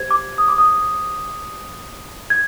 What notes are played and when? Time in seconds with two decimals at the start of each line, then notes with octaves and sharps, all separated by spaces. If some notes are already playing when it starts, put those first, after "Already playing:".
Already playing: G4 C5 G#6
0.11 D6
0.38 D#6
0.48 D6
0.58 D#6
2.30 G#6